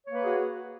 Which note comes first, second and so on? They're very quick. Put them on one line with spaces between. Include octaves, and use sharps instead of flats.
C#5 A#3 B4 G#4 F#4